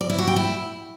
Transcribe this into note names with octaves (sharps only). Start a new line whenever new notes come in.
D5
E4
F#4
G5
E4